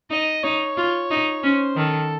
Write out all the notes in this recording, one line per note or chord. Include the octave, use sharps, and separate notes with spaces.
D#4 D#5
D#4 C#5
F4
D#4
C#4 C5
D#3 A4